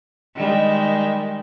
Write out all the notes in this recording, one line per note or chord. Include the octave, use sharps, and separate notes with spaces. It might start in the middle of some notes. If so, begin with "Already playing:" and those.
D#3 G3 G#3